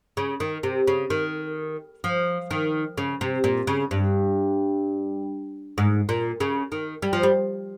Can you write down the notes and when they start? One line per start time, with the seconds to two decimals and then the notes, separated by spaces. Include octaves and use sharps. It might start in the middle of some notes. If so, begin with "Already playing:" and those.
0.17 C#3
0.40 D#3
0.63 C3
0.87 C#3
1.10 D#3
2.04 F3
2.51 D#3
2.97 C#3
3.21 C3
3.44 A#2
3.67 C#3
3.91 G2
5.78 G#2
6.09 A#2
6.40 C#3
6.72 D#3
7.02 G3
7.13 F3
7.23 G3